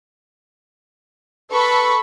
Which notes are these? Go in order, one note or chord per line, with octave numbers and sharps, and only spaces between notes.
A4 B4 B5 C#6